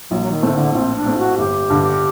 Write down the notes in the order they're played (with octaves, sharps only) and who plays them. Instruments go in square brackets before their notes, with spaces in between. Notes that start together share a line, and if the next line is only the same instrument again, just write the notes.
[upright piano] A#1 [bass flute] F#3
[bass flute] F#3
D#3
[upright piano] A2 A3 C4 [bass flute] D#3
[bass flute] D3
[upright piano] A#1 [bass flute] C4
[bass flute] D4
[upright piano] A2 A3 C4
[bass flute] F#4
[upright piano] G1 [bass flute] G4
[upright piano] G2 D3